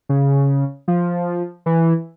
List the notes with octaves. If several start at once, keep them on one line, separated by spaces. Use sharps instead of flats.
C#3
F3
E3